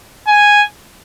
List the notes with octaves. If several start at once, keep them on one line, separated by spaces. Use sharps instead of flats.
G#5